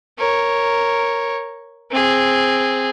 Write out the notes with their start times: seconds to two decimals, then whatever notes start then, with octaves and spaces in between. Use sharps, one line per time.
0.18 A#4 C#5
1.91 C4 G#4